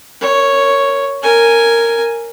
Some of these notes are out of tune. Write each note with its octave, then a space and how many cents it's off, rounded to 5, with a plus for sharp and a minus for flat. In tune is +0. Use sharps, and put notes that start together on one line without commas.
A#4 -15 C#5 +0
A#4 -10 G#5 +0